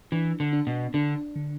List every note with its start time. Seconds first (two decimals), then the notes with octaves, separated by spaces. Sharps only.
0.12 E3 D4
0.40 D3
0.53 D4
0.67 B2
0.94 D3 D4
1.36 D3